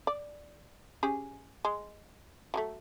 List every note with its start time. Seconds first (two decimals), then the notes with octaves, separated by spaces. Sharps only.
0.07 D5
1.03 C#4 G4 G#4
1.65 G#3
2.54 F#3 G#3 A3